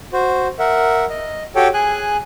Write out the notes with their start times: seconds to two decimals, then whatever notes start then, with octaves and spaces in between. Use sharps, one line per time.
0.13 F#4 C5
0.59 A#4 E5 F#5
1.10 D#5
1.55 F#4 G4 A4 C#5 G5
1.74 G#4 G#5 F#6